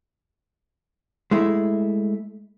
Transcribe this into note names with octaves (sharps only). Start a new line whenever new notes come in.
G#3 A3 E4